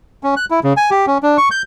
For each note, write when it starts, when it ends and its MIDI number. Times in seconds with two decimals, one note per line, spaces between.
0.23 0.35 61
0.37 0.45 90
0.51 0.60 64
0.64 0.73 49
0.77 0.90 80
0.91 1.06 67
1.07 1.18 61
1.23 1.37 62
1.38 1.49 85
1.51 1.62 91